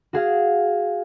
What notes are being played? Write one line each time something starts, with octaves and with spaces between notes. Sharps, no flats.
F#4 G#4 F5